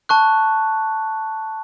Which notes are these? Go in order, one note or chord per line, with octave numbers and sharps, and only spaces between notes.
A5 C#6 F#6